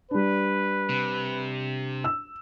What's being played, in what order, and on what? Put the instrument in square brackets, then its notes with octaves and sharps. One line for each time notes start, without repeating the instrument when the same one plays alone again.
[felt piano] G3 D4 [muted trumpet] B4
[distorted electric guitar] C3
[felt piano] E6